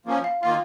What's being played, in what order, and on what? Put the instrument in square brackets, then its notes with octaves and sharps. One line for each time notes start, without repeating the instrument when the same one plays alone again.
[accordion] F3 A#3 C#4
[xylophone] F5
[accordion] D#3 A#3 F4 [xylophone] F5